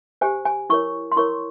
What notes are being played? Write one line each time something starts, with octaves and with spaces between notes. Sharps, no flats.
G4 C5 G#5
G#5
E4 A#4 C#5 C#6
C6
E4 A#4 C#5 C#6